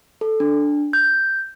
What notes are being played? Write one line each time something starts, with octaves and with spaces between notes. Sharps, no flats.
A4
D4
G6